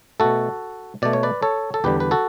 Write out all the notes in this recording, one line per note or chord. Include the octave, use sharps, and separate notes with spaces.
B2 A3 F#4 A4
B2 A3 D5
C#5
B4 D5
A4 C#5
A4
E2 D3 G3 G4 B4
B4
F#4 A4